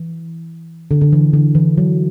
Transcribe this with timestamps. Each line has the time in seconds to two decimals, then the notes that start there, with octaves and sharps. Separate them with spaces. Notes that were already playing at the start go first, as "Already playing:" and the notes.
Already playing: E3
0.91 D3
1.01 D3
1.13 E3
1.33 D3
1.55 E3
1.78 F#3